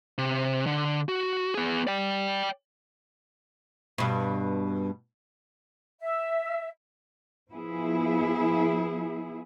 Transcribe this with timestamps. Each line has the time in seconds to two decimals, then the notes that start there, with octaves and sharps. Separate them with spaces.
0.18 C3
0.66 D3
1.09 F#4
1.54 B3 G#4
1.87 D5 G5
3.98 G2 B2
6.01 E5
7.50 F3 B3 E4 G#4